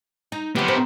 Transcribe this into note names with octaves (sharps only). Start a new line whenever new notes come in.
D#4
F3 F#3 B3 G4
A#4 C5